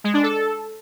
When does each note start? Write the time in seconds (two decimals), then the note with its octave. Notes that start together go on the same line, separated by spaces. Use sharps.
0.04 G#3
0.14 D4
0.23 A4